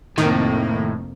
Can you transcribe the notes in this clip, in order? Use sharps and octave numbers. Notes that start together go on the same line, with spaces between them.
F1 F2 A2 D#3 A#3